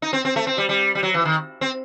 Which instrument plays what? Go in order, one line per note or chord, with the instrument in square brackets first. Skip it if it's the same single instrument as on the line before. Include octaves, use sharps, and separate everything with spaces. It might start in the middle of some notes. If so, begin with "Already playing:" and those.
[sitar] D#4
C4
C4
A3
C4
G3
G3
G3
F#3
E3
D#3
C4